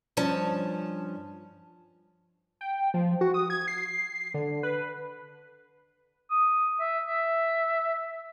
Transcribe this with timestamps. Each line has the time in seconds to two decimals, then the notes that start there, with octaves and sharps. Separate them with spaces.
0.17 G2 F3 C#4 A5
2.61 G5
2.94 F3
3.21 F#4
3.34 D#6
3.50 G#6
3.68 C7
4.34 D3
4.63 B4
6.31 D#6
6.80 E5
7.06 E5